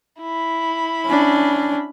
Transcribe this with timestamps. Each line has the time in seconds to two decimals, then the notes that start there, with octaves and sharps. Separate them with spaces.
0.21 E4 B5
1.06 C#4 D4